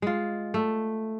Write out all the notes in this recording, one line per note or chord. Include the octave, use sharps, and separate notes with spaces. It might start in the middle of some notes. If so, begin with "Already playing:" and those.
G#3 F4
A3